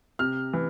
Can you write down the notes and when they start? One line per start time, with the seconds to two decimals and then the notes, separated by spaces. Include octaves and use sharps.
0.19 C3 F6
0.53 E3